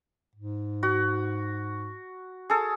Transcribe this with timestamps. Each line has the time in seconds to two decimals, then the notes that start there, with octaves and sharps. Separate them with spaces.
0.35 G#2
0.83 F#4
2.50 G#4 A4